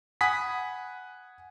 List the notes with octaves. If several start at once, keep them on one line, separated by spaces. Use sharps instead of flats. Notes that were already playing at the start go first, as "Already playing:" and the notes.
F#5 G#5 B5 D#6 B6